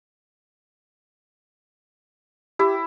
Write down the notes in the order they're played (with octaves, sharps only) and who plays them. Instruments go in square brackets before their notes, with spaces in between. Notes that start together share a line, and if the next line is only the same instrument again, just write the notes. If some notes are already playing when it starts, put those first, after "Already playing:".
[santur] E4 [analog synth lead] G4